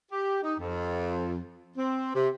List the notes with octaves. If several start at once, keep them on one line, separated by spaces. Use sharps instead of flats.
G4
D#4
F2
C4
C3